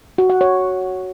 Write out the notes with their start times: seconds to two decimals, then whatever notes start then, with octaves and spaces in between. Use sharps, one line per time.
0.18 F#4
0.30 F#5
0.41 C#5